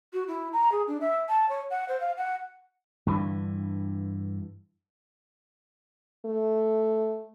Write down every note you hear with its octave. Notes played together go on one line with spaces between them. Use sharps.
F#4
E4
A#5
G#4
D4
E5
A5
C#5
F#5
C5
F5
F#5
G2 D3 E3
A3